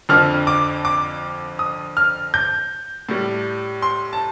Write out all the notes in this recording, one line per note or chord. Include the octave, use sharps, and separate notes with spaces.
F2 D3 F3 F6
D6
D6
D#6
F6
G6
A2 G3
C6
A5